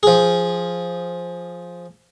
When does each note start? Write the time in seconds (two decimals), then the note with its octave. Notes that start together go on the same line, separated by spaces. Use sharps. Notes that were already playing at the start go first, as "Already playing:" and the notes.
0.03 F3 G#4